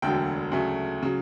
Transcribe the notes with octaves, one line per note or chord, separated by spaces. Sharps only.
E1 D2 D3 F#3 G5
D2 C#3 F#3 A3
C#3 F#3